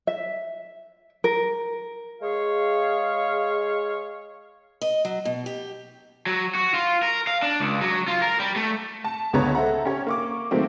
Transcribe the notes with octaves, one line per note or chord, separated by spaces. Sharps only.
E5
A#4
G#3 G#4 C#5 F5
D#5
F#3
B2
G4
F#3
F#4
F4
A#4
F5
D4
C#2
F#3
F4
A#4
G3
A3
A5
C#2 D3 B3 C#5 A#5
A4 C5 E5 F#5 A#5
C#4 G4 C#5
A#3 C#6 D6
D#3 F#3 A3 A#3 C4